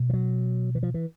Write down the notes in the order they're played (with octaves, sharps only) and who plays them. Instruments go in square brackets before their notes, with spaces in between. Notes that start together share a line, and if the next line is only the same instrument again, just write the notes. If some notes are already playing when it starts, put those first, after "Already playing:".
Already playing: [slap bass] B2
F3
F#3
E3
F3
E3